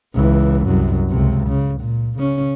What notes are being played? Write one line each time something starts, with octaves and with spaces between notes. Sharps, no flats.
C#2 E3
C2 F#2
C#2 C3
C#3
A#2
C#3 C#4